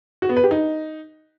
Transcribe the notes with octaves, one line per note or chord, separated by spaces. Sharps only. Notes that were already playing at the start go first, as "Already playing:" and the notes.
F#4
B3
B4
G4
D#4